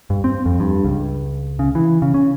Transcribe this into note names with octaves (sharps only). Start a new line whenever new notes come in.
G2
C4
F2
G2
C#2
C#3
E3
C#3
C#4